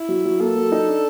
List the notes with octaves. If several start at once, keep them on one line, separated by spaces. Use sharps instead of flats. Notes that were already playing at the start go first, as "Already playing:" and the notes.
Already playing: E4
F#3
F#3
A#3 A4
F#3
D#4
D4